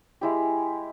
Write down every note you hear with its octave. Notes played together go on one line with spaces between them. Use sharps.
G#3 E4 G4